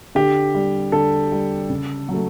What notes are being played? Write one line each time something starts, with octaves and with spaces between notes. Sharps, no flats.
D3 G4
G3
D3 A4
G3
C#3
F#3
A3